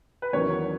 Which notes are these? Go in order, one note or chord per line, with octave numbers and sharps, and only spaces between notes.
B4
E2 D#3 F#3 C#4 C#5